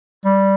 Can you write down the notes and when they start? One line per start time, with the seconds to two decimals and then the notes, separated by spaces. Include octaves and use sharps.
0.25 G3